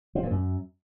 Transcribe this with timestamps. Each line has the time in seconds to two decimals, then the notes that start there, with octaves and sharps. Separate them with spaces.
0.15 F3
0.23 A#2
0.30 F#2